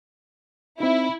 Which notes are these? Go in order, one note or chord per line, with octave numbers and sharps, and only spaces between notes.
C4 D#4 E4